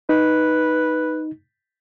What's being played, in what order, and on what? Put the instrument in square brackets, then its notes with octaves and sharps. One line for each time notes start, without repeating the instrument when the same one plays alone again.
[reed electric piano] D#4 [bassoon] B4